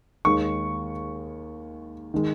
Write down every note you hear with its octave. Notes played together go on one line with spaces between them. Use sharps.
D#2 D#3 G#3 C#6
D#3 G#3